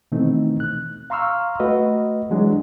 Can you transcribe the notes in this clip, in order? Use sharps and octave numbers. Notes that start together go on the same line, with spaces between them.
B2 D#3 E3 A3 C4 D#4
F#6
F5 A#5 C6 C#6 E6 F6
A3 F#4 B4 D#5
E3 F#3 G#3 D4